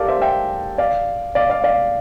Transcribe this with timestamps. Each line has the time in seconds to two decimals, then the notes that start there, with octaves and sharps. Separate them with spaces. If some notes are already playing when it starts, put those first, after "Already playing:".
Already playing: G4 A4 A#4 D5 F5
0.08 C5 E5
0.22 E5 G5
0.78 D5 F5
1.35 D5 F5
1.50 D5 F5
1.64 D5 F5